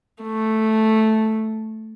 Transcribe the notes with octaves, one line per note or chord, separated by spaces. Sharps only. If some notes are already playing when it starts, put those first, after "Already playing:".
A3